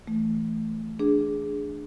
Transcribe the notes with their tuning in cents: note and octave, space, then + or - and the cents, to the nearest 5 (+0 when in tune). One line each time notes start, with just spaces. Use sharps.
E3 +10 A3 +0
D4 +0 G#4 +0